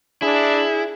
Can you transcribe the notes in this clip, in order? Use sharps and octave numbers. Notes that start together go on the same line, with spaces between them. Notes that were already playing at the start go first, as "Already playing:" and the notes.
D4 E4 G#4